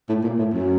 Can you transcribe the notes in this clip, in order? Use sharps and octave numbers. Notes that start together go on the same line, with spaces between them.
A2
A#2
A2
F#2